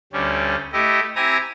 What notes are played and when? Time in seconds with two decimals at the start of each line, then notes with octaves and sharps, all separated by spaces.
0.12 D2 G3 C#4
0.73 A3 E4 G4 D#5
1.16 C4 E4 G4 G#5 A#5